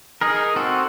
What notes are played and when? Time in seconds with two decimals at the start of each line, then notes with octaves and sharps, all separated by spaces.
0.21 D#4 G#4 A#4
0.56 C4 F#4 A4